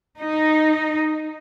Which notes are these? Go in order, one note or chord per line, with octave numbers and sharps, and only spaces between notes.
D#4